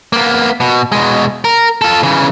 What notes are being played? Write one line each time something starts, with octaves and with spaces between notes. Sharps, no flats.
A#3 B3
B2
B2 G#3
A#4
F4 A4
C#3 E3